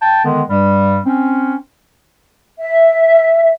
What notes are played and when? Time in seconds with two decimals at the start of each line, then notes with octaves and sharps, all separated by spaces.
0.01 G5 A5
0.25 D3 D#3 G#3 B3
0.50 G2 G3
1.06 C4 C#4
2.58 E5